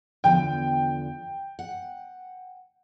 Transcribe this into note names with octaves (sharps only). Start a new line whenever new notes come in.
E2 D3 F3 G5
F#5